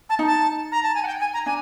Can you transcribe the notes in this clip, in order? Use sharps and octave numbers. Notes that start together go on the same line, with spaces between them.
A5
D#4
A5
A#5
A5
G#5
F#5
G5
G#5
A#5
D4 G#5